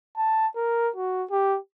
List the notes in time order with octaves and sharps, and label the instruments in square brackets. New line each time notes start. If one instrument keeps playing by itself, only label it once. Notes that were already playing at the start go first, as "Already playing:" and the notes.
[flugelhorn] A5
A#4
F#4
G4